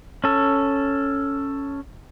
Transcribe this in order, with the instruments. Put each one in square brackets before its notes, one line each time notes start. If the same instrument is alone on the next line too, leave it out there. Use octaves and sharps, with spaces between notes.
[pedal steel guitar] C#4 A4